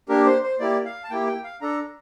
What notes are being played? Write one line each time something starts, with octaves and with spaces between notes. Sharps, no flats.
A#3 D4 G4 A#4
C5
C5
A#3 E4 G4 D5
F5
A5
A#3 E4 G4 G5
G5
F5
D4 A4 A#5